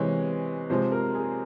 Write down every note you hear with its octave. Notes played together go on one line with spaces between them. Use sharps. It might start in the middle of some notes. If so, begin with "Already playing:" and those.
Already playing: C3 E3 G#3 C#5
C3 F3 G#3 C5
A#4
G#4